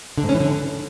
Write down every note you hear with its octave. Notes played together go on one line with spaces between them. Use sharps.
D3
G#2
C#4
E3
D3